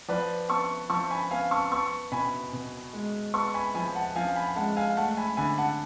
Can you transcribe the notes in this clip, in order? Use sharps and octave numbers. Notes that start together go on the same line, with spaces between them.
F3 B4 D5
B3 A5 C#6
F3 A5 C#6
G#5 B5
B3 F5 G#5
A5 C#6
B3 A5 C#6
B2 G#5 B5
B2
G#3
B3 A5 C#6
G#5 B5
F3 G#5 B5
F#5 A5
F3 F5 G#5
G#5 B5
G#3 F#5 A5
F5 G#5
A3 F#5 A5
G#5 B5
D3 G#5 B5
F#5 A5